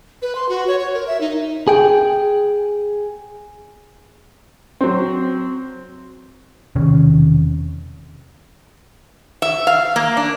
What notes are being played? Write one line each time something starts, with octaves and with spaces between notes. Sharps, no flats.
B4
C6
F#4
C#5
C#5
A#4
E5
D#4
G#4 G5
F#3 C4
E1 C3 D#3 C#4
E5
F5
A#3
D4